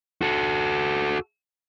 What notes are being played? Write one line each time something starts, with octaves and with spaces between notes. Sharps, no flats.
F#4 A4